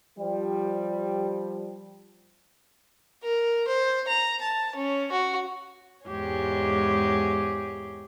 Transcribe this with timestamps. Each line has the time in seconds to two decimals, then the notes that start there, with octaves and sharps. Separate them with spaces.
0.18 F3 G3
3.23 A#4
3.68 C5
4.08 A#5
4.42 A5
4.76 C#4
5.12 F#4
6.06 E2 G#2 G#3 G4 G#4 C#5